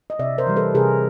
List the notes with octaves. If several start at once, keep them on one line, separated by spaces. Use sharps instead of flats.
D#5
C3 D5 E5
A#4 C5
E3 G3
A4 B4
C3 G#4 A#4